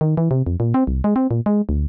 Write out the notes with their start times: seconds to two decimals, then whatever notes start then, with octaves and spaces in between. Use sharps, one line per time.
0.01 D#3
0.17 E3
0.31 C3
0.46 F2
0.60 A#2
0.74 C4
0.87 C2
1.04 G#3
1.16 C4
1.31 A#2
1.46 G#3
1.69 D2